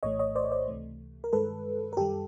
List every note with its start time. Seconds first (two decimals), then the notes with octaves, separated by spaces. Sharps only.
0.03 A#1 A2 E3 A3 C#5 D#5
0.19 C#5 D#5
0.35 C5 D5
0.44 C#5
0.52 C5 D5
0.68 C#2 C3 E3 A3
1.24 A#4
1.33 G2 D#3 G#3 A4 B4
1.93 A#4
1.97 F#2 D#3 G3 G4 A4